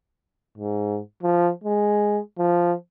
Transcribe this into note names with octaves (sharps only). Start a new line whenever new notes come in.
G#2
F3
G#3
F3